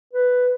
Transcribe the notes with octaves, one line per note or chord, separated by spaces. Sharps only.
B4